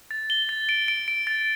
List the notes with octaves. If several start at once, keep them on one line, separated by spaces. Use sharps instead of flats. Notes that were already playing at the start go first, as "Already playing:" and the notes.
A6
G7
A6
D7
D7
D7
A6